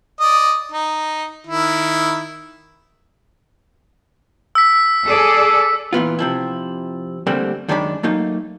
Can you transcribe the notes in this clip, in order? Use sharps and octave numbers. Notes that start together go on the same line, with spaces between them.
D5 D#5
D#4
D#3 E4
E6 B6
G#4 A4 D5
A#2 E3 B3 F4
C3 F3 E4
D3 G3 A3 A#3 C4 D4
F#2 D#3 G#3 D4 D5 B5
F#3 A3 A#3 D#4